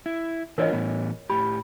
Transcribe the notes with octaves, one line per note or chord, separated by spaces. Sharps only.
E4
E3 D4 F4 A#4 C#5 D#5
A2 E3 B3
A2 G4 B5